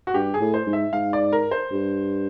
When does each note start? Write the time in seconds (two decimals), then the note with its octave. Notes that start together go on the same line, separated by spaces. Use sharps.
0.07 F#4
0.14 G2 G4
0.34 G#4
0.40 A2
0.54 C5
0.67 G#2
0.73 E5
0.93 G#2 F5
1.13 D5
1.33 A#4
1.51 C5
1.72 G2